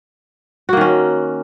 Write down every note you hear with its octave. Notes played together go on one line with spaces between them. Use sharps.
D#3 A#3 C#4 F#4